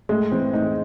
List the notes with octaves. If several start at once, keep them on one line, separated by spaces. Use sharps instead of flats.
A2 G#3
E3 C4
A2 D#4